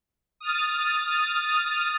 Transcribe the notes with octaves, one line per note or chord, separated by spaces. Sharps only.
D#6 F6 A6